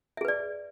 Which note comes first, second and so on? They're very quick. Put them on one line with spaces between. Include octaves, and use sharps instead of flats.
E5 G#4 B4 D5